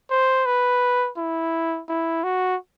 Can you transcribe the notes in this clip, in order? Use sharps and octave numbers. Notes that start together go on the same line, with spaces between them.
C5
B4
E4
E4
F#4